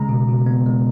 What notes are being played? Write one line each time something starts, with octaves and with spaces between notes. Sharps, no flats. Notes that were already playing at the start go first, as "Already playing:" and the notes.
Already playing: C#3 G#3 A#5
B2
B2
B3
G#3